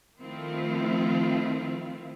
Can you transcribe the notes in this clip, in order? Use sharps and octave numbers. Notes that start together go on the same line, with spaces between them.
D#3 F3 A3 C4 E4 F4